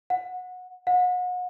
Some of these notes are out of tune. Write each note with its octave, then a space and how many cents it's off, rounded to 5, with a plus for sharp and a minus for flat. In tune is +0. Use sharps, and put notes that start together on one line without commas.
F#5 -20
F#5 -35